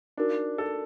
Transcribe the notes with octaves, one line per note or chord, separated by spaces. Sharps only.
D4 D#4 F#4 A#4
A4